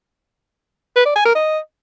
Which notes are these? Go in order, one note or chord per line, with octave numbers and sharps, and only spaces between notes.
B4
D5
G#5
A#4
D#5